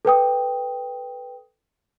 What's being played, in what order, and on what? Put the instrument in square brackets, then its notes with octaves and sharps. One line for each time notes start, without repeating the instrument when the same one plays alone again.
[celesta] A4 B4 G5 D#6